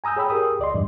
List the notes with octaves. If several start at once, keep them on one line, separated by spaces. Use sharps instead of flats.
G#5 A#5 D#6 E6 G6
G#4 C#5 G5 B5 E6
G4 G#4 A#4 G5 D#6
C#2 D5 D#5 C6
E2 G2 A#2 E3